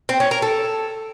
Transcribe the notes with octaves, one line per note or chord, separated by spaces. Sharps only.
C4
C#4
A#4
A4